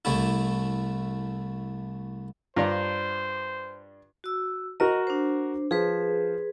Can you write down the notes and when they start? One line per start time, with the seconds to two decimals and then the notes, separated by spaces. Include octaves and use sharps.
0.05 C2 A3 E4
2.56 G2 D4 F4 C5 A#5
4.24 F#4 E6
4.80 F#4 A#4 D#5 A#5
5.07 D4 C5
5.71 F3 G#4 B4